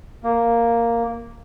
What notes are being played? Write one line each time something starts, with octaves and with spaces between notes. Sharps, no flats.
A#3